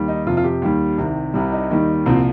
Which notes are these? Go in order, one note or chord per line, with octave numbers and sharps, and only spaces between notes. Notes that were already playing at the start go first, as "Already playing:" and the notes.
Already playing: D#2 D#3 G3
D#4
F2 C3 F3 F4
F4
G4
D#2 D#3 G3
C2 C3 D#3
C2 C3 G3
D#4
D#2 D#3 G3
C2 A#2 F3 C4